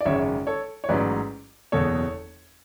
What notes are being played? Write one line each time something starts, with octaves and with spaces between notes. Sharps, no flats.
D5
G#1 F#2 C#3 G#3 C#5 E5
A4 C#5
C#5
A1 G#2 F#3 C#4 B4 D5
F#1 E2 B2 A4 C#5